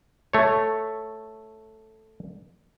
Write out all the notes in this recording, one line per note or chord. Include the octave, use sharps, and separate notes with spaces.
A3 C#5